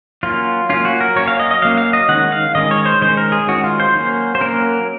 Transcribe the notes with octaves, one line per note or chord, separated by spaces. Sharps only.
F#3 A#3 C#4 F4
F#3 A#3 C#4 F4
F#4
A#4
F#3 A#3 C#4 C#5
F5
D#5
D#5
F#3 A#3 C#4 F5
F5
D#5
D#3 G#3 C#4 F#5
F5
D#3 G#3 C#4 D#5
C#5
C5
D#3 G#3 C#4 C5
A#4
G#4
D#3 G#3 C#4 F#4
F4
C5
F#3 A#3 C#4
C5
F#3 A#3 C#4 A#4